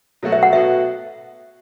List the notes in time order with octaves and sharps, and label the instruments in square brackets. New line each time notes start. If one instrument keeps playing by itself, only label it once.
[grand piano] B2 F#3 A3 F#4
[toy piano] E5
F#5
[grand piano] B2 B3 F#4 A4 [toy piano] E5